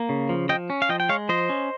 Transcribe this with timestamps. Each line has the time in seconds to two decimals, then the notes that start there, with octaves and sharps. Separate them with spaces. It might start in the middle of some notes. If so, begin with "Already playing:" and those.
Already playing: A#3
0.09 C#3
0.29 F3
0.49 F3 D#5 G5
0.70 C#4
0.82 F5
0.89 F3 D#5 G5
1.00 G5
1.09 G#3 C#5 F5
1.29 F3 C5 D#5
1.49 C#4